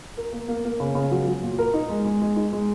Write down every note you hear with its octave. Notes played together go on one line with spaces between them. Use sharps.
A#4
A#3
A#3
A#3
C#3
C#3
F#3
F#3
A#2
A#4
D#4
G#3
G#3
G#3
D#4
G#3